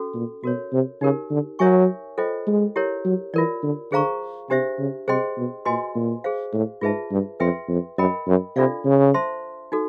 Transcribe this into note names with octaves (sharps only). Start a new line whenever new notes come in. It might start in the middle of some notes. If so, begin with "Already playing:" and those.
Already playing: C#4 F#4 A4
A#2
B2 F#4 A#4 C#5
C3
C#3 D#4 G4 A#4
D3
F#3 A#4 C#5 E5 G#5 C#6
F4 A4 C5 D#5 G5
G#3
E4 G4 A#4 C#5
F#3
E3 F4 A#4 D5
D3
D3 G#4 C5 F5 A#5 C#6
C3 D4 G4 C5 E5
C#3
C3 G#4 C5 D#5 G5 C6
B2
A#2 F#4 B4 D#5 G#5 C6
A#2
G#4 C5 F5
A2
G#2 F4 G#4 B4 E5 A5
G2
F2 B4 E5 G5 C6
F2
F#2 A#4 D#5 G5 B5
F#2
C3 D4 F4 A4 D5 F5
C#3
C5 E5 A5 C6
D#4 F#4 A4